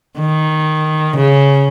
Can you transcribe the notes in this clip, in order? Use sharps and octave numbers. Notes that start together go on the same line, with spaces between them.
D#3
C#3